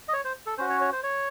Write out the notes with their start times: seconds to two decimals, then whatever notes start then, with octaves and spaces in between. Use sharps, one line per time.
0.08 D#5
0.13 C#5
0.25 C5
0.46 A4
0.58 C#4 F#4 C5
0.70 C#5
0.81 C#5
0.92 C5
1.03 C#5